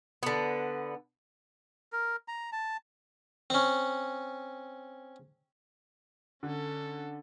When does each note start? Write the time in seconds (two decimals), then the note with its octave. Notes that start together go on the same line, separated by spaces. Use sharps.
0.23 D3 B3
1.92 A#4
2.28 A#5
2.52 A5
3.50 C4 C#4
6.43 D3 C#4 A4